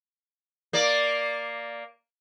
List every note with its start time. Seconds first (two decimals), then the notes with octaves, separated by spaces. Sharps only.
0.73 A#3 D5